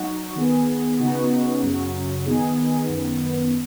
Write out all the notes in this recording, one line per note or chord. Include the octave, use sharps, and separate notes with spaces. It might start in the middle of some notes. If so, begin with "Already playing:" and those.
Already playing: F#3 D#4 F#4
D#3 B3 G#4
C#3 B3 D#4 F#4
F#2 C#3 F#3
D#3 B3 D#4 G#4
F#2 D#3 B3